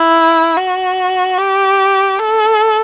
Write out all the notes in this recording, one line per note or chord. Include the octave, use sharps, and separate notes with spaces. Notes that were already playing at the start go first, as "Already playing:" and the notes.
Already playing: E4
F#4
G4
A4